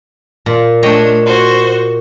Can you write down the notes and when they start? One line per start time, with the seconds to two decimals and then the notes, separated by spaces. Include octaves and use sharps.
0.46 A#2
0.83 A3 D4 C#5 D#5 G5
1.26 F#4 C5